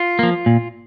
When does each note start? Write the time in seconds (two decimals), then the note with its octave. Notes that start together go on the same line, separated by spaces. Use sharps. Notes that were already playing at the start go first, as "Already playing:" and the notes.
Already playing: F4
0.19 F3 A#3
0.46 A#2